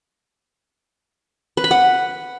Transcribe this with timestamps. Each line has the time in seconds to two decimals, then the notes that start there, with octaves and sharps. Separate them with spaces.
1.57 B4
1.64 B5
1.71 F#5